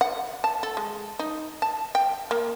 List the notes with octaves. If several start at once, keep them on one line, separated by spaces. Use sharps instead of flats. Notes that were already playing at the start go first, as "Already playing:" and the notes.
F#5
A5
A4
G#3
D#4
A5
G5
A#3